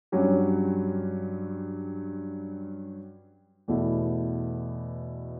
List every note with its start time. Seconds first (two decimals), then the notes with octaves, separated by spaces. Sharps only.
0.12 G2 F#3 C#4 G4
3.68 E2 B2 A3 E4